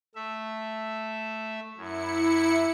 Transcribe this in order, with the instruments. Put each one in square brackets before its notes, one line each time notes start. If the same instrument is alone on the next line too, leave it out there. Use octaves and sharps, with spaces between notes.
[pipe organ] A3 E5
[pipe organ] F#2 [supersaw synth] E4 C#7